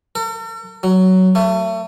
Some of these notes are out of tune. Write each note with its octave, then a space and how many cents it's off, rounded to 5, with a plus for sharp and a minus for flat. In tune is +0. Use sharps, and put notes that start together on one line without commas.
A4 +45
F#3 +10
A3 +30